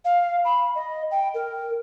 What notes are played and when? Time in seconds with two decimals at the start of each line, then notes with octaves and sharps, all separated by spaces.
0.05 F5
0.45 B5
0.75 D#5
1.11 G5
1.34 A#4